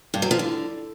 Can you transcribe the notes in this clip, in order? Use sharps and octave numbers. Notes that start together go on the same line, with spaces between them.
G2
F#3
F3
D3